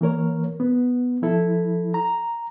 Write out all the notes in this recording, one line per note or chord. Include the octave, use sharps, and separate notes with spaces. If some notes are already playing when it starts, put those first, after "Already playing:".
E3 A#3 A#4 C#5
B3
F3 E4 A4
A#5